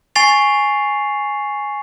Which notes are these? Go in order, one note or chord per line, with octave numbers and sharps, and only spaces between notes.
G#5 C#6 A6 C7 F7